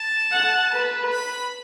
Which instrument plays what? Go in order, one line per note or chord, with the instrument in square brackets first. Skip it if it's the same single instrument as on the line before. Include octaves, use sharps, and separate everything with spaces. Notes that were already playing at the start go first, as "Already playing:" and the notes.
Already playing: [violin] A5
[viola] F#5
B4
[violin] B5